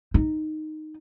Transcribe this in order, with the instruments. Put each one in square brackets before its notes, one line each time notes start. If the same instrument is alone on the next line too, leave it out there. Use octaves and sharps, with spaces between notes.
[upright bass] D#4